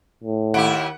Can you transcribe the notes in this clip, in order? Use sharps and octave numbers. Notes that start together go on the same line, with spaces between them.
A2
D#2 E4 G4 F#5 D7